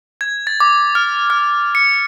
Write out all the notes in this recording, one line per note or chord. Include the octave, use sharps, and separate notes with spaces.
G#6
A6
D6
F6
F6
C#7